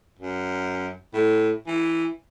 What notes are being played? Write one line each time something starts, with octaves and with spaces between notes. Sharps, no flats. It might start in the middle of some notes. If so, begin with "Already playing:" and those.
F#2
A2
E3